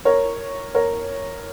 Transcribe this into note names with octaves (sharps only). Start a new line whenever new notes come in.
A#4 C#5
A#4 C#5